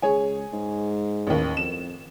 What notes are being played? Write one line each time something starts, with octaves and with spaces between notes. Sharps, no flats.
C#2 G#4 C#5 G#5
G#2
A1 D#2
F2 E7